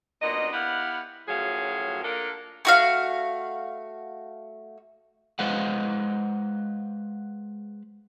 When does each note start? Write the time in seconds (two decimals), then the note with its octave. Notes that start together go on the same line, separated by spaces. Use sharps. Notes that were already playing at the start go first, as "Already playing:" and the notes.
0.22 F#2 A#2 B3 D4 D#5
0.52 B3 E4 G4 F5 F#5
1.28 F#2 A2 F3 F#3 G#4 F5
2.03 A#3 D4 F4 A4 A#4
2.65 A3 F#4 F5
5.39 G#3 B4 C5 D#5 F5 F#5